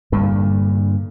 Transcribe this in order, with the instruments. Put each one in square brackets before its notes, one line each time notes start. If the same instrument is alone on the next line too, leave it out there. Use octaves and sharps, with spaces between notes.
[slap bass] G2 A#2 D3